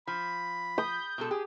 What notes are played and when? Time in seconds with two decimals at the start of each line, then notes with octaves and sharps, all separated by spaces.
0.07 F3 B5
0.78 D#6 G6
1.18 B2 G#3 A4
1.31 G4 G#4